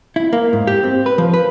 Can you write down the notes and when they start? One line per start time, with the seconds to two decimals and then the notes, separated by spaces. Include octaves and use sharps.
0.16 E4
0.33 A#3
0.53 G#2
0.67 G4
0.84 C4
1.06 B4
1.18 F3
1.34 B4